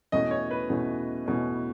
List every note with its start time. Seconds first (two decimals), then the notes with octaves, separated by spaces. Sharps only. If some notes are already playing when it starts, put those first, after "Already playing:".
0.12 E2 B2 A3 C#4 D#5
0.31 C#5
0.51 B4
0.69 E2 B2 A3 C#4
1.26 E2 B2 A3 C#4